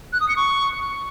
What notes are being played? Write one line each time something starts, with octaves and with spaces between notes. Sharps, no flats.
F#6
D#6
C#7
C#6